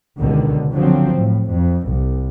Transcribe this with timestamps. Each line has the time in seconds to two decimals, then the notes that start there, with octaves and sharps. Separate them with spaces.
0.19 C#2 B2 D3 D#3
0.73 D3 F3 F#3 C4
1.15 A2
1.54 F2
1.88 C2